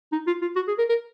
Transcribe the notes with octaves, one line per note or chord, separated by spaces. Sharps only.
D#4
F4
F4
F#4
G#4
A#4
A#4